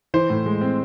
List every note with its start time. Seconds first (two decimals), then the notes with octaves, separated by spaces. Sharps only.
0.14 E3 C5
0.30 A2
0.46 G#3
0.61 C4